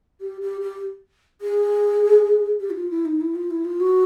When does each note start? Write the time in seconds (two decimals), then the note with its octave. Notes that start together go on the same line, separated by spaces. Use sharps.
0.21 G4
0.41 G4
0.61 G4
1.41 G#4
2.60 G4
2.70 E4
2.75 F4
2.91 E4
3.05 D#4
3.21 E4
3.35 F4
3.51 E4
3.65 F4
3.80 F#4